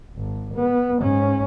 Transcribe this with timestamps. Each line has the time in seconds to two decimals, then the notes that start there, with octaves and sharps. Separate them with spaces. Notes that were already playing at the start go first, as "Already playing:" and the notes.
0.16 G#1
0.55 B3
1.00 G#2 C#4